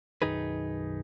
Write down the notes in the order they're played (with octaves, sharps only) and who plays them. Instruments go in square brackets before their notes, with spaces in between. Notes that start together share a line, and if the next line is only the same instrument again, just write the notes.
[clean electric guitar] B1 F#2 D#3 D#4 G#4 B4